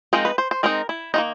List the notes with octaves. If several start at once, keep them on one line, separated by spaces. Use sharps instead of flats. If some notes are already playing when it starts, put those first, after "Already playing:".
F3 G#3 C4 D#4 A#4
B4
C5
C5
G#3 C4 D#4 A#4
E4
D#3 G3 A#3 D#4